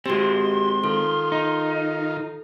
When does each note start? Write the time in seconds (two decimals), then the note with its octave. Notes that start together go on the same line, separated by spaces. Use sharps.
0.06 G#3 C4 F#4 G4 C6
0.84 D#3 F4 A4
1.32 D#4